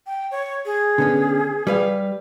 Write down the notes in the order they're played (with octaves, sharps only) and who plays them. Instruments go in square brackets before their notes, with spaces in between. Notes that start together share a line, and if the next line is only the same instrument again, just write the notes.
[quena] G5
C#5
G#4
[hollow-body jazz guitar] D3 B3 C#4
G3 B4 F5